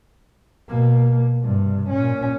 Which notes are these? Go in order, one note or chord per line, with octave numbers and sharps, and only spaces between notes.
B2 A#3
G2 C3
A#2 C#4